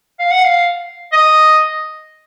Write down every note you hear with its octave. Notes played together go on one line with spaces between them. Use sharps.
F5
F#5
F5
D#5